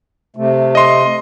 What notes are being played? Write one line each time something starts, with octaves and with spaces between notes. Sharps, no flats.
C3 A3
D#5 C6